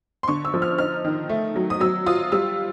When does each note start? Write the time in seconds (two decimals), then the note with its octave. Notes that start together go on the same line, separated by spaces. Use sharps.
0.23 C6
0.28 D3 C#6
0.45 E6
0.54 F3
0.62 F6
0.78 D#4 F6
1.05 D#3
1.29 A3
1.56 F#3
1.70 D#6
1.80 F#3 E6
2.06 F4 D#6
2.32 G3 E6